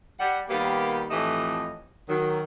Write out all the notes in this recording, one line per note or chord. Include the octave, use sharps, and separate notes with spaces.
G3 F#5
D#3 G3 A#3 B3 G4
F2 A2 E3 A3 G4 D#5
D#3 F#3